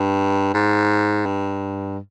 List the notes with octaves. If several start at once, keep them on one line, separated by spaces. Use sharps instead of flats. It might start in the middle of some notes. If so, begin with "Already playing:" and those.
Already playing: G2
G#2
G2